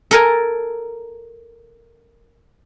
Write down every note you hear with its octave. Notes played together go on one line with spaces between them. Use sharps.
A4 A#4 G#5